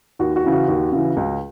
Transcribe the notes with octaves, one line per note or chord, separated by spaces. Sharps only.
D#2 F#4
F#4
C#3 E3
F#4
D#2
C#3 E3
C#2